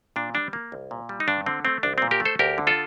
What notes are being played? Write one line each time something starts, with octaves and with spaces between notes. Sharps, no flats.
A#2 D4
G3 D4
A#3
C2
A#2
G3
D#4
G2 D4
D3 C4
A3 C4
C2 D4
A#2 C4
G4 A#4
A3
A4 C5
D2 G4 A#4
D3
F4 A4